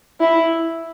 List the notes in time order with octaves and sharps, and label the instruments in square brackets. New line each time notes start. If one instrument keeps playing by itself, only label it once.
[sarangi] E4